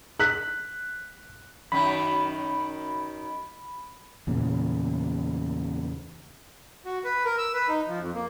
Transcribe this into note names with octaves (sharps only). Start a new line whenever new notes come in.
F#6 B6
F#2 D#3 B5
E2 A#2 C#3
F#4
B4
A#4
E6
B4
D#4
F3
F2
A#3